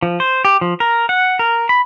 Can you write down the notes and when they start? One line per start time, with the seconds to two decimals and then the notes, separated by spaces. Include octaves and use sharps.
0.03 F3
0.20 C5
0.45 G4
0.61 F3
0.80 A#4
1.09 F#5
1.39 A#4
1.69 B5